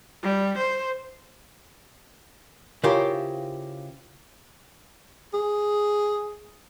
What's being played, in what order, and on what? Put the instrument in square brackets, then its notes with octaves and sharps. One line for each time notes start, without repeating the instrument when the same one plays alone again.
[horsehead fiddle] G3
C5
[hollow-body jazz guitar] C#3 E4 F4 G4 A#4 C5
[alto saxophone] G#4